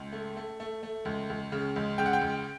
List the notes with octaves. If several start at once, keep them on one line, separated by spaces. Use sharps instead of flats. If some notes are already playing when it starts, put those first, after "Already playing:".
Already playing: C#2
A3
A3
A3
A3
C#2
C#2
C#3
C#2
C#3 G5
F#5
G5
C#2